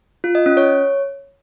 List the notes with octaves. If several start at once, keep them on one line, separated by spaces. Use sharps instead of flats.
F4
D#5
C#4
C#5